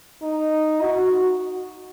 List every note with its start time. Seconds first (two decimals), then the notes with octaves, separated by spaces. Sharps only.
0.23 D#4
0.82 F#4